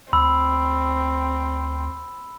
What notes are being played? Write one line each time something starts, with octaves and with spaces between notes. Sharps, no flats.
D2 C4 B5 E6